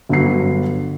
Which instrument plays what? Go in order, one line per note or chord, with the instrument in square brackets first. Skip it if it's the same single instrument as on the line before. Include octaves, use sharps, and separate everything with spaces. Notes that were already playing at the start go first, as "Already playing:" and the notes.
[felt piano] G1 F#3 C7